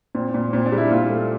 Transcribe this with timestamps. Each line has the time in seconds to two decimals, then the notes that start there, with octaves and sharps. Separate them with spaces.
0.15 A#2 C4
0.34 A#2
0.53 A#2 C4
0.66 D4
0.72 G3
0.78 E4
0.90 A#2 F4
1.10 A3